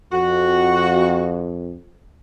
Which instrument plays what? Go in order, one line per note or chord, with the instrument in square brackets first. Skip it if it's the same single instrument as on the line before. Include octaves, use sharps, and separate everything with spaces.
[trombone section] F2 [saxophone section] F#4